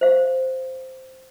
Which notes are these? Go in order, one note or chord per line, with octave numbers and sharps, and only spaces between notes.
C5 F5